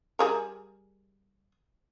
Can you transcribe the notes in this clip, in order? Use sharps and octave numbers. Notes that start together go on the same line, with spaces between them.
G3 G#4 A#4